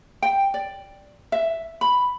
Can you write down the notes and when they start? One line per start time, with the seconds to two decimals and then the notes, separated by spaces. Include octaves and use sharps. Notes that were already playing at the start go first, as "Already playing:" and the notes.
0.22 G5
0.54 D5
1.32 E5
1.81 B5